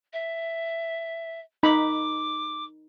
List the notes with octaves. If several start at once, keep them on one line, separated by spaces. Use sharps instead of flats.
E5
D#4 B5 D6